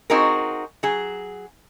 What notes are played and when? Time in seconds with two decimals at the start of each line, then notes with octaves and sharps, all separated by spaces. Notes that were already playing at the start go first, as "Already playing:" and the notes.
0.10 C4 D#4 F#4 G#4 A#4
0.83 F#3 G#4